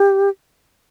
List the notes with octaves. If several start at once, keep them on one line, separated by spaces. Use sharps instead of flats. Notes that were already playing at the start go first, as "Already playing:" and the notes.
Already playing: G4